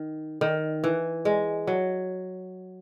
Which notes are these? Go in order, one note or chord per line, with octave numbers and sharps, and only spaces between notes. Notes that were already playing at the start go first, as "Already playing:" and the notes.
Already playing: D#3
D#3
E3
G#3
F#3